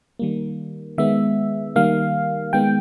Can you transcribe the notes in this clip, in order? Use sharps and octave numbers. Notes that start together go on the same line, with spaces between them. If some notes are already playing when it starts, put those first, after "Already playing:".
D#3 G3 A#3
D#3 G#3 B3 E5
D#3 G3 A#3 F5
D#3 G#3 B3 G5